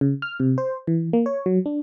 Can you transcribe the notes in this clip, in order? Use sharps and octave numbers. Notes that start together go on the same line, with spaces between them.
C#3
F6
C3
C5
E3
A#3
C#5
F#3
D4